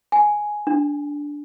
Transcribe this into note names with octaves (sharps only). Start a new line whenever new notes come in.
G#5
D4